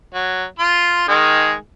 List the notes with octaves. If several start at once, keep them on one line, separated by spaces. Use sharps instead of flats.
F#3
F4 C6
D#3 G#3 G#4